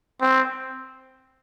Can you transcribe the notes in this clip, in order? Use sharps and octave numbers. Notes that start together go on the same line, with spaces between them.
C4